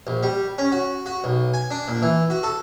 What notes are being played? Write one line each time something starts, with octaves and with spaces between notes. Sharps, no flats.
A#1
G3
C#4
F#4
F#4
B1
G#5
D4
A#2
E3
F#4
A4